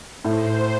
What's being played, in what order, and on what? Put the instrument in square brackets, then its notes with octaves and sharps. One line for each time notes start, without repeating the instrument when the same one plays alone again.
[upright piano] A2 [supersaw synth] C5